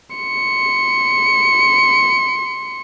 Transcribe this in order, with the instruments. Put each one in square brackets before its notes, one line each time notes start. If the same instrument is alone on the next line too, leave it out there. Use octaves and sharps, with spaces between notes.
[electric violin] C6 C#7